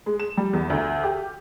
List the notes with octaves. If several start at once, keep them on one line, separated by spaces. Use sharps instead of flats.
G#3
E7
G3
E2
D2
G4